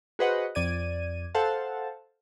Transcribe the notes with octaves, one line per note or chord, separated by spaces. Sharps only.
F#4 G#4 B4 C5 D#5 F#5
F2 D5 G#6 D#7
A4 C5 F5 F#5 A5